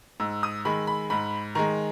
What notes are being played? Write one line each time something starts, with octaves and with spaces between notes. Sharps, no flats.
G#2 E6
D#6
D#3 G#3 B5
B5
G#2 B5
D#3 G#3 A#5